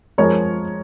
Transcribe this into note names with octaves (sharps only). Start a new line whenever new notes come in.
F3 G#3 A#4 C#5